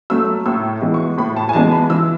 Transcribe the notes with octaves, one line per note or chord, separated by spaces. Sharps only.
F#3 A3 E6
A2 E6
E3 G#3 B3
C#6
A2 B5
A5
G#5
E3 G#3 B3 A5
B5
E3 E6